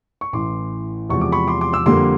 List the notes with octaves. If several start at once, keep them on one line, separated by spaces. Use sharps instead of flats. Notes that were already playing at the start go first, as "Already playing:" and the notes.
C#6
A1 A2 E3 C6 D6
E2 C3 F3 G#3 C#6
D6
B5 C#6
C6 D6
C6 D6
D6 E6
F2 D3 G3 A#3 C6 D6